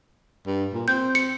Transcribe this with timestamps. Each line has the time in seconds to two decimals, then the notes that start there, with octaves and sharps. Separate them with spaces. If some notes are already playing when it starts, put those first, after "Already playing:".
0.46 G2
0.73 A#2
0.88 C4 G6
1.15 C#7